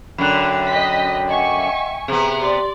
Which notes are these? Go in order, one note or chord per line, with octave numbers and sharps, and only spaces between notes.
F#2 D3 G5 B5 F#6
D#5 B6
D#5 E5 F#5 G#5 C#6
C3 B3 G#4
G4 D5 C6